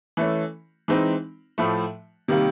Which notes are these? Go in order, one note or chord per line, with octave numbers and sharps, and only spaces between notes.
E3 A3 C#4
E3 G#3 C4 D#4
A2 F3 A3
C3 D#3 G3 A#3